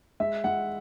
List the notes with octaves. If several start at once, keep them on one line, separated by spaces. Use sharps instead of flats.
G#3 E5
G#3 F#5